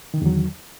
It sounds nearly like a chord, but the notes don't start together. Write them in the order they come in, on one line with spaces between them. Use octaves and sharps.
D#3 D3 E2 F#3